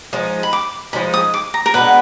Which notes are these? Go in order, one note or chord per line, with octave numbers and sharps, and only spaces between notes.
F3 G#3 D#4
B5
D6
F3 G#3 D#4 B5
D#6
D6
A#5
A#4
B2 G#3 B3 D4 B4